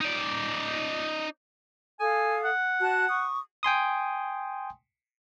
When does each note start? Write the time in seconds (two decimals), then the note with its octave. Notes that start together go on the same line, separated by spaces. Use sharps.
0.01 D#4 D5
2.00 A4 F5 G#5 D#6
2.44 F#5
2.81 F#4 A5 F#6
3.08 C#6 D#6
3.63 G5 G#5 C6 D#6